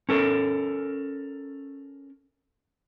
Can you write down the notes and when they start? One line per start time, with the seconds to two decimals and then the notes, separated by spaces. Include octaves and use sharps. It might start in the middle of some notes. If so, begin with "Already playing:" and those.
0.09 C#4 A4 A#4